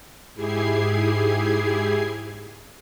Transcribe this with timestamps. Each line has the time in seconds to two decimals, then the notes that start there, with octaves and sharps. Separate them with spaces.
0.34 G#2 E4 G4 G#4 G#6 C7